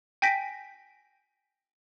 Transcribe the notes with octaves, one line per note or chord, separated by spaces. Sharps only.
G5 G#5 G6 A#6 B6 D7